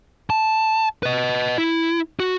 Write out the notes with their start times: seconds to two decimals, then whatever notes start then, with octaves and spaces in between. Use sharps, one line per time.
0.30 A5
1.03 B4 D#5
1.58 E4
2.20 F#4